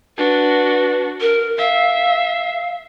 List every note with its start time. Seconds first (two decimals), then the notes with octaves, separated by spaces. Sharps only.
0.18 D4 F#4 B4
1.21 A#4
1.58 E5 F5